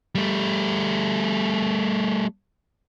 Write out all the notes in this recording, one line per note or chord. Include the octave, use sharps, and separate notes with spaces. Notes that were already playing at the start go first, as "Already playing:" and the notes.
G3 A3